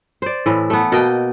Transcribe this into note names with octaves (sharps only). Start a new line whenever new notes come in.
C5 D5
A2 E3
A3 B3
B2 A#3 D#5 G5